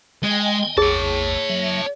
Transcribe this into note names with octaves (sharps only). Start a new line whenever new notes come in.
G#3 D#5 G5 G#5
A1 E2 G#4 C#5 A5
F#3 E5